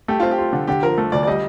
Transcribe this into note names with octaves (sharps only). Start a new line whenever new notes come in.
A3 G4
C4 F4
G4
F4
D3
D3 G4
F3 A#4
A3
D2 D5
D5
G3 D#5